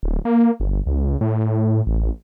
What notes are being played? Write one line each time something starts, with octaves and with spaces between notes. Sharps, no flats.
D1
A#3
G1
C#2
A2
A1